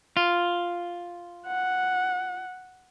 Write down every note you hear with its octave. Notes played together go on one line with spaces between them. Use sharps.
F4
F#5